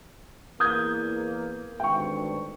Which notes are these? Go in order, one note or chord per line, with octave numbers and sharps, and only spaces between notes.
E2 A#3 D#6 G6 G#6
G#1 D2 G2 G5 C#6